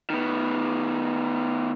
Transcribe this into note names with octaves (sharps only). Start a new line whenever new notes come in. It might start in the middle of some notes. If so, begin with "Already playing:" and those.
D#3 B3